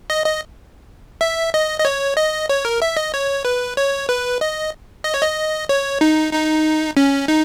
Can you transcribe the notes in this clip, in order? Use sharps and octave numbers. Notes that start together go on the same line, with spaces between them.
D#5
D#5
E5
D#5
D#5
C#5
D#5
C#5
A#4
E5
D#5
C#5
B4
C#5
B4
D#5
D#5
C#5
D#5
C#5
D#4
D#4
C#4
D#4